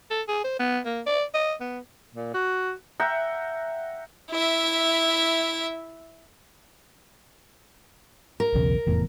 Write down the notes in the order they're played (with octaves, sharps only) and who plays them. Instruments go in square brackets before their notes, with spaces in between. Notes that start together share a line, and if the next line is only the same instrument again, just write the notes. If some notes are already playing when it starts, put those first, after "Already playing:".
[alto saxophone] A4
G#4
C5
B3
A#3
D5
D#5
B3
[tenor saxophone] A#2
F#4
[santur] E5 F#5 G5 A#5
[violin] E4 E5
[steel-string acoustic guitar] A#4
[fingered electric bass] B1 E2 C#3
F1 E2 A2